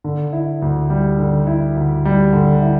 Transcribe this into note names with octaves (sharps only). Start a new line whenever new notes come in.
D3
E4
D2
G3
D3
E4
D2
G3
D3
E4